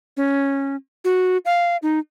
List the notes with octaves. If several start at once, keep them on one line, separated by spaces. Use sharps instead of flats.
C#4
F#4
F5
D#4